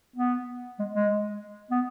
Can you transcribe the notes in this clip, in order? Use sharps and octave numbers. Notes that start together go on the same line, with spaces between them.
B3
G#3
G#3
B3